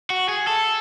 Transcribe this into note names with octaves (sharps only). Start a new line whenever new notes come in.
F#4
G#4
A4